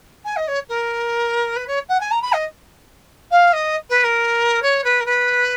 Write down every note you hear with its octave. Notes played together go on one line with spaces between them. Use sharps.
G#5
D#5
C#5
A#4
B4
C#5
F#5
G#5
A#5
B5
D#5
F5
D#5
B4
A#4
C#5
B4
A#4
B4